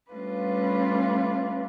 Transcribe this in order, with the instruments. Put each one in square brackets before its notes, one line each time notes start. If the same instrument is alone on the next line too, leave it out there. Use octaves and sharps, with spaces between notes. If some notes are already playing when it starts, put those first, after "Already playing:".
[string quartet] G3 A3 C#4 D4 F4 B4